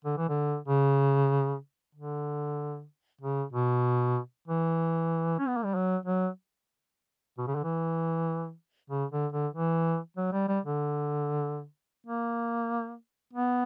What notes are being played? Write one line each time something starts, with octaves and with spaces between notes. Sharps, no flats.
D3
E3
D3
C#3
D3
C#3
B2
E3
C#4
B3
A#3
G3
F#3
F#3
B2
C#3
D3
E3
C#3
D3
D3
E3
F#3
G3
G3
D3
A#3
B3